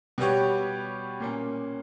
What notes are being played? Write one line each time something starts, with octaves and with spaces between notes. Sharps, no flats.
B2 G3 B3 G4 C#5
A#2 A#3 C#4